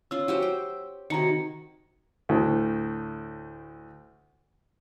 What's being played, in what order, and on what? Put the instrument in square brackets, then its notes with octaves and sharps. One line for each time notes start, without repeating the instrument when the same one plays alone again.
[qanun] C#4 F4 [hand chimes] E6
[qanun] F#3 G4 C5
G5
[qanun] C3 D#3 [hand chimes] F#4 A#5 C#7
[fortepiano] D2 A2